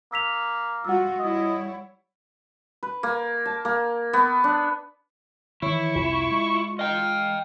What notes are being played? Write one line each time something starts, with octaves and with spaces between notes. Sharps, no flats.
A#3 E6 B6 F7
G3 F4 F#4 F#5 E6
G3 E4 C#5 D#5
B4
A#3
A5
A#3
B3
D4
D#3 E3 E4 C#5 C#6
C2 F2 C3 F4
G#3
D#5 F5 G5